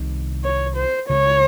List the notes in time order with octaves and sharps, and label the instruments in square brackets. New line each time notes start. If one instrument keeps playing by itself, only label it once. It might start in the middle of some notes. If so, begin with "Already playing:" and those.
Already playing: [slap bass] C2 C3 D#3
[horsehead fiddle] C#5
C5
[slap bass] C#2 C#3 F3 G#3 [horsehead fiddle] C#5